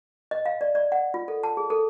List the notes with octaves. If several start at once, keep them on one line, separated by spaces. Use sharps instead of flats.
D#5
F5
D5
D5
F#5
F4
A4
A5
G#4
A4